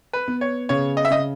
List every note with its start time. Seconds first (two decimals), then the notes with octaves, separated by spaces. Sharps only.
0.13 B4
0.28 B3
0.41 C#5
0.69 C#3 C#5
0.97 D#5
1.05 E5
1.10 C#3 D#5